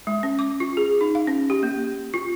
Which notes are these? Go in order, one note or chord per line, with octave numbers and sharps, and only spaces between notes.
G#3
C#4
D6
F4
G#4
D#4
F5
C#4
G4
A#3
F4